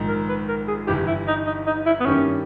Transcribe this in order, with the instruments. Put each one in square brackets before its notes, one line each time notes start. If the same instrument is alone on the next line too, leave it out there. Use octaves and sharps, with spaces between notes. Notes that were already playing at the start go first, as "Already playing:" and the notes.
Already playing: [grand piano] A#1 G#2 D#3
[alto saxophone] A#4
B4
A#4
G#4
[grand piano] G1 G2 E3 [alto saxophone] G4
[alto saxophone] E4
D#4
D#4
D#4
E4
B3
[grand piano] G2 D#3 A#3 E4 G4 [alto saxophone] C#4